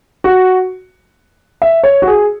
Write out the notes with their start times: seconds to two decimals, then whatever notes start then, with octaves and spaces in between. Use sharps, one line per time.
0.24 F#4
1.62 E5
1.83 C#5
2.02 F#4
2.07 G#4